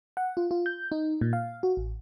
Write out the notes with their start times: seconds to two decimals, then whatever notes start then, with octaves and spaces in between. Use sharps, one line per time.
0.17 F#5
0.37 F4
0.51 F4
0.66 G6
0.92 D#4
1.21 A#2
1.33 F5
1.63 F#4
1.77 A1